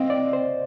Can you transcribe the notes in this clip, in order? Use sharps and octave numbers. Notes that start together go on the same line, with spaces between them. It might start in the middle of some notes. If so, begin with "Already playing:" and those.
Already playing: C4 D#5 F5
D5
C5